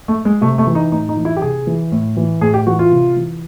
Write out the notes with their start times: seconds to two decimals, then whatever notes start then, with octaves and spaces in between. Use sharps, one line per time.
0.08 A3
0.25 G#3
0.41 C3 A3
0.58 A3
0.67 E3
0.75 D#4
0.92 A2 D#4
1.09 D#4
1.16 E3
1.25 E4
1.37 G4
1.41 C3 G#4
1.67 E3
1.92 A2
2.17 E3
2.41 A2 G#4
2.54 G4
2.67 E3 F#4
2.79 F4
2.92 C3
3.16 E3